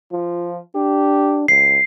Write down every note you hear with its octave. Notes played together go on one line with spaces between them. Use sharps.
F3 F4
D4 G4
C#2 C7